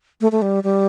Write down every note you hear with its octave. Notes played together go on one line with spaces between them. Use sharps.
A3
A3
G3
G3